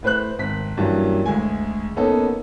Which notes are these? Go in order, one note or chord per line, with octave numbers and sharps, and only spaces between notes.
A2 B4 C5 F#6
G#1 B6
G2 E3 F#3 A#3 C#4
D2 G#3 G#5
A#3 B3 C#4 D#4 A4